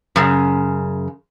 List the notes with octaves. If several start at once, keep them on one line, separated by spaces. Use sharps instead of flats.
F#2 C#3